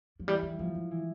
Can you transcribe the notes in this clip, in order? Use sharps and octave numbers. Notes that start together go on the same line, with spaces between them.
F3
E3 G3
G#3
G3
F3 A#3
G#3
E3